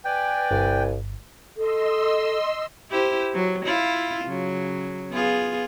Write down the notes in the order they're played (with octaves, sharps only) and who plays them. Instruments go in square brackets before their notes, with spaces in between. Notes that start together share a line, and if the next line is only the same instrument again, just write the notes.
[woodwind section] B4 D5 G#5 [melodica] G5
[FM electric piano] G1 [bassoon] C2
[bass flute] A4 [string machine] D#5 C6 E6
[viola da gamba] E4 G4 C5
F#3
E4 F4
C#3 F#3
B3 F4 G#4